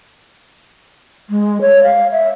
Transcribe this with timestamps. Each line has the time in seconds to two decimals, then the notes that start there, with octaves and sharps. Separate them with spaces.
1.30 G#3
1.61 C#5
1.83 F5
2.12 E5